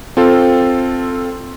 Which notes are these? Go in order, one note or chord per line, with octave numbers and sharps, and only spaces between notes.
C4 F4 A4